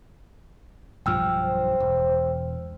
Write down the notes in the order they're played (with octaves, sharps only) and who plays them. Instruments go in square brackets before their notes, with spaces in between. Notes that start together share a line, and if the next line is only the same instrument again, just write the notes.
[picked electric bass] B1 G2 F3 [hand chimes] G5 E6 F6
[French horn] C5
[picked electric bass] E1